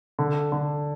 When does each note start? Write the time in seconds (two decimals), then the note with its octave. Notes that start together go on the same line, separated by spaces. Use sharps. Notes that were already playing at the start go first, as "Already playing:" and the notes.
0.19 D3
0.52 D3